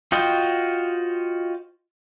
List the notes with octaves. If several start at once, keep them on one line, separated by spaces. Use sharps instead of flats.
F4 F#4 C5 D#5 G5